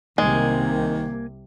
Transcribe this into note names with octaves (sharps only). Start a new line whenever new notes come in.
C2 C3 D#3 G#3 A#3 G#5